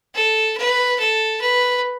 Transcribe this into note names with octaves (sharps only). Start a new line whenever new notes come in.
A4
B4
A4
B4